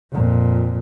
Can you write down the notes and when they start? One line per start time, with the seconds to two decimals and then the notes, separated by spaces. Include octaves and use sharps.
0.12 F2 A#2